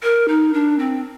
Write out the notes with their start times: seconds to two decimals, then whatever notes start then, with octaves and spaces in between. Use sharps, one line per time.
0.03 A#4
0.28 D#4
0.54 D4
0.79 C4